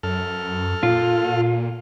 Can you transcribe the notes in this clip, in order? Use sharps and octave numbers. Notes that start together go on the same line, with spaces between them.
F#2 A4 F6
A#2 F4